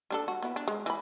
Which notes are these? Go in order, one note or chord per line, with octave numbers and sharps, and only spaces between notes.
G3 D4 A4
F#4
B3 E4
D4
G#3
E3 B5